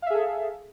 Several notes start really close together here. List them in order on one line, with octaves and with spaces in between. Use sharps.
F5 E5 G#4 A4